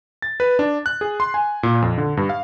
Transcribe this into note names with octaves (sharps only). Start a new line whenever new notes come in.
A6
B4
D4
F#6
G#4
C6
G#5
A#2
F2
D3
G2
F5